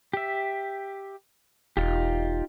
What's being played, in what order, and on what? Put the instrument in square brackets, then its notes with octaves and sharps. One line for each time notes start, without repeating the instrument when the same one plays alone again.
[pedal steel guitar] G4 E5
[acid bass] E1 [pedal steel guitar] D#4 F4 G4